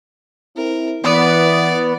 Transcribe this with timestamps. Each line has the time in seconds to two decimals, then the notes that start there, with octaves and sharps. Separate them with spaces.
0.57 C4 E4 A#4
1.04 E3 B3 D5